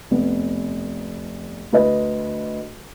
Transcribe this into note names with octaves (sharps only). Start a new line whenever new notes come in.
F1 B3
D2 B4 D#5